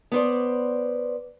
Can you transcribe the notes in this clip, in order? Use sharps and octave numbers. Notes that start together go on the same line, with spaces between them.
B3 C5 D5